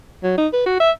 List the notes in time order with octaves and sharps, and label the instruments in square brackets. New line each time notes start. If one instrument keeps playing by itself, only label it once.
[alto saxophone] F#3
D#4
B4
F#4
E5